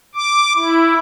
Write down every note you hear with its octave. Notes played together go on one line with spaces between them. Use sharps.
D6
E4